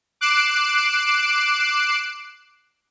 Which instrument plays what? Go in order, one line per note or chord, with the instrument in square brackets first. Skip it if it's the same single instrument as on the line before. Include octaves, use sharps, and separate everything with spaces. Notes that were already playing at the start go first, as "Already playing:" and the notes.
[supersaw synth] D6 F#6 C7 D7 E7